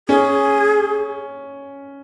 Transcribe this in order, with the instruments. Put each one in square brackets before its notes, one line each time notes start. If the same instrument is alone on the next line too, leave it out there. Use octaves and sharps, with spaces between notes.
[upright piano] C#4 [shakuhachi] G#4